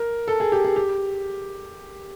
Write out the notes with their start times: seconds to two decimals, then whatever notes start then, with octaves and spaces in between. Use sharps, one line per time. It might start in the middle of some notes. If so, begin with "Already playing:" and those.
Already playing: A#4
0.28 A4
0.40 G#4
0.52 G4
0.64 G#4
0.76 G4